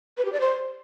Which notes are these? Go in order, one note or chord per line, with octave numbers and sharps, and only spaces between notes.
B4
G4
D5
C5